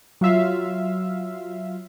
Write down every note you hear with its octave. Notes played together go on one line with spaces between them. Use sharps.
F#3 F4 E5 F5